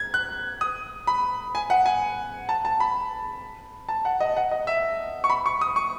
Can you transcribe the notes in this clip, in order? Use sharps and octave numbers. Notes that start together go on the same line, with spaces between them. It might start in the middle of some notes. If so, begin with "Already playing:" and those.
Already playing: G#6
F#6
D#6
B5
G#5
F#5
G#5
A5
A5
B5
A5
F#5
D#5
F#5
D#5
E5
C#6
B5
C#6
D#6
C#6